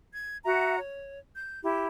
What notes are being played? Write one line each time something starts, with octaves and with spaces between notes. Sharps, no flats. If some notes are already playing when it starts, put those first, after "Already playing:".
G#6
F#4 E5 F#5 A#5
C#5
G6
E4 G4